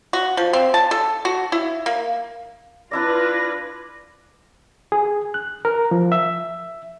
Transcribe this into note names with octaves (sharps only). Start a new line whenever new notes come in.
F#4
F3
C4
A5
A4
F#4
E4
A#3
D4 E4 F4 B4 D5 A#6
G#4
F#6
A#4
F3
E5